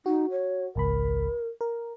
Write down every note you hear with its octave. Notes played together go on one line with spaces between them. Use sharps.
D#4 F#4
C#5
G#1 C#2 A#4 B5
A#4